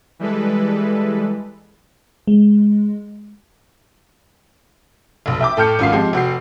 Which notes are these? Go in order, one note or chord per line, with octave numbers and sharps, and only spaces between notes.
E3 G3 G#3 A4 B4
G#3
F1 B1
E5 G5 D6
A2 A4 G5 F6 G6 C#7
G#1 F#2 F4 F5 C7
F3 G#3 C4 G4
F1 F#4 G5 C7